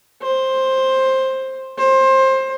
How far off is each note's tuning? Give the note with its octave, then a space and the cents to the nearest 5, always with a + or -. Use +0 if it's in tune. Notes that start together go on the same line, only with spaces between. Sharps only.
C5 +10
C5 +20